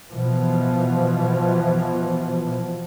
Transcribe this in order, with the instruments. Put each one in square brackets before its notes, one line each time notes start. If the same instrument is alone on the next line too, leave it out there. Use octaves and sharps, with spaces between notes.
[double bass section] B2 E3 F3